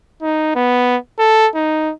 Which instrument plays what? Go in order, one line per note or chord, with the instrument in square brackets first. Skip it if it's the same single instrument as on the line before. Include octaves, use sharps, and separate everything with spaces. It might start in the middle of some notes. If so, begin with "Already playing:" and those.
[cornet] D#4
B3
A4
D#4